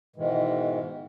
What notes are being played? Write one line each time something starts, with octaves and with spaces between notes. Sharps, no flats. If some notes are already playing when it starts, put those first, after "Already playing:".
G#2 B2 D#3 E3 G#3